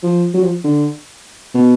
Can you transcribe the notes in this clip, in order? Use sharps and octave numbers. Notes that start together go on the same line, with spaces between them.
F3
F#3
F3
D3
B2